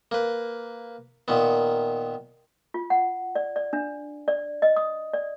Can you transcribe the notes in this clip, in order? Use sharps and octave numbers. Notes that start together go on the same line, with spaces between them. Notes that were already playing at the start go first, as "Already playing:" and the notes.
A#3 B4
A#2 D#3 B3
F4
F#5
D5
D5
D4
D5
D#5
D#6
D5